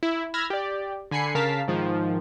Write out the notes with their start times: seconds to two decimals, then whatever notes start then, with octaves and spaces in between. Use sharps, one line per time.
0.03 E4
0.34 B5 E6 F6 G#6 A#6
0.50 G4 D5
1.11 D3 G#5 B5 C7 C#7
1.35 C#3 A#4 F5 A5 B6
1.68 G#2 D#3 F3